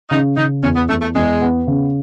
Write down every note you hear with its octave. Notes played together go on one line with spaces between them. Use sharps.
C#3 D#4
C#3 D#4
E2 C#4
B3
E2 A3
A3
E2 G#3
B3
C#3